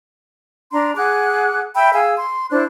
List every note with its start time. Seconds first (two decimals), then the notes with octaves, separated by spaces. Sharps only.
0.72 D4 A#5 C6
0.96 G#4 F#5 D6 F#6
1.75 E5 G5 B5 E6
1.93 G#4 F5 G#5 E6
2.18 C6
2.51 D4 E4 C5 F#6